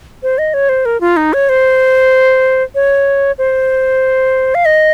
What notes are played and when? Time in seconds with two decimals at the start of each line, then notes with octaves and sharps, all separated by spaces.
0.23 C5
0.38 D#5
0.54 C#5
0.69 C5
0.85 A#4
1.01 F4
1.17 D#4
1.33 C#5
1.49 C5
2.75 C#5
3.38 C5
4.55 F5
4.65 D#5